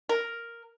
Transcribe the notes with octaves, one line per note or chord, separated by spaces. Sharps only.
A#4